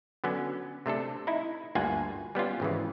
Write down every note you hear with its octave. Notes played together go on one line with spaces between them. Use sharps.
D3 F#3 B3 C#4
C3 A3 D4 A4
D#4 E4
D2 G2 A#3 F4 F#5 G#5
G3 B3 C#4 F4
G#1 C#3 E3